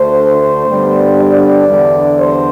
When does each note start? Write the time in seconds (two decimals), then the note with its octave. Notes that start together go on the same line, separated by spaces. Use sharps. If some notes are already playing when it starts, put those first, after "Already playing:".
Already playing: D2 D3 A3 C5
0.68 G2 D3 G3 B3 D4
1.18 D5
1.68 E2 D3 G3
2.18 C5